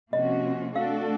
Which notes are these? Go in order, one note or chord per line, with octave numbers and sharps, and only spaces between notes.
C3 F3 A#3 C#4 F#4 D#5
A3 D4 F#4 A4 F5